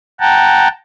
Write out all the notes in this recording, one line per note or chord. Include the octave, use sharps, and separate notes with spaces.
F#5 G5 A5 A#5